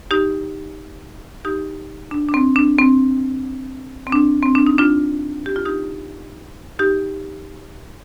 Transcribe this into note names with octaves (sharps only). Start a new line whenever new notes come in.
D#4 G4
D#4 G4
D4
D4
C4
D4
C4
C4
D4
C4
D4
D#4
D4 F4
G4
F4
D#4 G4
D#4 G4